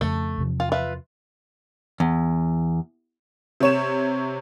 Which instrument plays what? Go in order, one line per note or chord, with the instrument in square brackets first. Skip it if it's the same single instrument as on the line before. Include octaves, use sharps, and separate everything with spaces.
[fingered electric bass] F2 C#3 [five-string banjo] A3
[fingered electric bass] E2 C3 F3
[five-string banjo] F4
F4 B4 E5
[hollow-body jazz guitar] E2
[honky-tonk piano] C3 C#5 E7